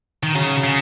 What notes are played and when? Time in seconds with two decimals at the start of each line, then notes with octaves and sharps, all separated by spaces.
0.23 D#3
0.35 C#3 F#3
0.64 C#3